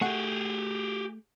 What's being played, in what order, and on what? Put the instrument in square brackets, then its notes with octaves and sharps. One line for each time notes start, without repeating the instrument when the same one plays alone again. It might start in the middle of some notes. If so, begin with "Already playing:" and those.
[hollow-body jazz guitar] A3 F#5 [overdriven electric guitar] G4 G#4